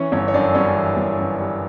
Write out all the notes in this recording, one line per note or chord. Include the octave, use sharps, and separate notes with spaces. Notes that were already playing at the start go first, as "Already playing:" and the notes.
Already playing: E3 C#4 C#5
G1 C#4 C#5
C#5
F#2 D4 D5
G3 C#4 C#5
E3
G1
F#2
G3